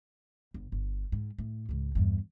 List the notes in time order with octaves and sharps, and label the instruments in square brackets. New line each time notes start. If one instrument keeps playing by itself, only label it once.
[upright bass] G1
G1
G#2
A2
C#2 G#2
E2 G2